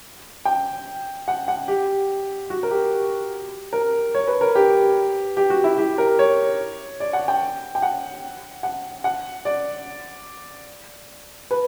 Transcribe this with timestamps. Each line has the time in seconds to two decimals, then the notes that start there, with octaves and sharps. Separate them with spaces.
0.45 G5
1.28 F#5
1.48 F#5
1.68 G4
2.50 F#4
2.63 A#4
2.71 G4
3.73 A#4
4.15 C#5
4.28 B4
4.41 A#4
4.55 G4
5.37 G4
5.50 F#4
5.64 E4
5.78 G4
5.98 A#4
6.19 C#5
7.00 D5
7.13 F#5
7.28 G5
7.75 G5
7.82 F#5
8.63 F#5
9.04 F#5
9.45 D5
11.51 B4